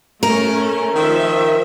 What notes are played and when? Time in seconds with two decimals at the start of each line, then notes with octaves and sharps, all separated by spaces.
0.23 A3 C#4 A#4
0.95 D#3 F3 E5